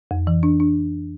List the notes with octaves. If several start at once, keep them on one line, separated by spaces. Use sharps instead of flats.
F2
E3
D4
D4